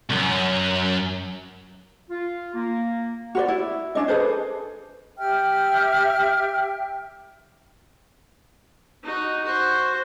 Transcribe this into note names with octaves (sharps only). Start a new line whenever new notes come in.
C2 F#2
F4
A#3
F#4 B4 D5
E4
C#4 D4 D#5
G#4 A4 B4 C5
G4 E5 G5 F6
D#4 F#4
F#4 C5